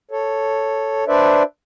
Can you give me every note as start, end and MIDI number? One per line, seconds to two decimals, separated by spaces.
0.11 1.04 69
0.11 1.04 73
1.08 1.43 62
1.08 1.43 71
1.08 1.43 72
1.08 1.43 74
1.08 1.43 76